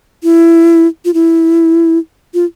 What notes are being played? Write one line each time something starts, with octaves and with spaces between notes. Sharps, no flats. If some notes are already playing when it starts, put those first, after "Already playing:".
E4
F4
E4
F4